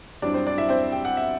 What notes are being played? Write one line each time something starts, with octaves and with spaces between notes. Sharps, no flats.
G2 F#3 C4 D4 E4 D5
C4 C5
D4 D5
E4 E5
C4 C5
G5
F#5
E5